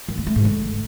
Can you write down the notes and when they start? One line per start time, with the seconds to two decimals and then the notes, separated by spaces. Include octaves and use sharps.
0.08 D#3
0.18 A#3
0.27 A3
0.36 G#2
0.45 D3